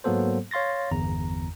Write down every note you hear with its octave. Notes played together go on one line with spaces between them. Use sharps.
G#2 F#3 A#3 B3 A4 C5
C#5 F5 C6 A6 A#6
G1 E2 A#5